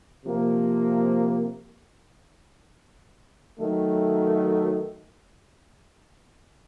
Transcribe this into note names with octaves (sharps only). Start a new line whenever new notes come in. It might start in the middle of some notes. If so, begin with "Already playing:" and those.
C3 F3 A#3
D#3 F#3 A3